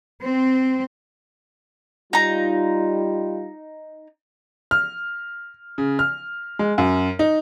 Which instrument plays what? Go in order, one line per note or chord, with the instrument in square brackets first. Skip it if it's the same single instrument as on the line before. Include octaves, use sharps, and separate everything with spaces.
[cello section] C4
[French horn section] G3 F4 [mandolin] D#4 A#5
[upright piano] F6
C#3
F6
G#3
F#2
D#4